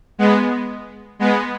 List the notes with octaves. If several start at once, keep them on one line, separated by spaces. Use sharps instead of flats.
G#3 B3
G#3 B3